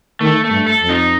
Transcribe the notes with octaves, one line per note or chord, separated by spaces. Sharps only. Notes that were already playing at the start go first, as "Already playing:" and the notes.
D#3 A3
A3
G2
A4
F2
D#4